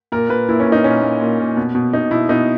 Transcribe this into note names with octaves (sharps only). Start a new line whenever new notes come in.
A#2 A#4
A#2 B4
A#2 E4
C#4
A#2
D#4
A#2 C#4
A#2
A#2
A#2
B2
B2
B2 D#4
B2 E4
B2 D#4